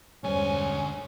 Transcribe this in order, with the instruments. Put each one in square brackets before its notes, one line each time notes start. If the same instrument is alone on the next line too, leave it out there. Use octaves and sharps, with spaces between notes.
[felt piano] E1 G2 C5 [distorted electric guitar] D2 G#5 [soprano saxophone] C#4